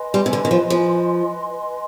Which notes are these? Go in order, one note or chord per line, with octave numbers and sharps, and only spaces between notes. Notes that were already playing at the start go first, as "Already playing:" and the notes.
Already playing: B4 D#5 G#5 C6
G3
C3
D3
D#3
F3
F3